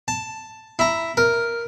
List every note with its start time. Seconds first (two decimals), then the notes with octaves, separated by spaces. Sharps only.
0.08 A5
0.79 E4 A#5
1.17 A#4